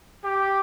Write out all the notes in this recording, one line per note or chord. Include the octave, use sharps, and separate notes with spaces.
G4